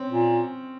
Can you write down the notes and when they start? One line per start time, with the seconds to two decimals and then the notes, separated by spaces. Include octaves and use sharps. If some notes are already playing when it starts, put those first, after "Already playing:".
Already playing: C4 C#4
0.10 A#2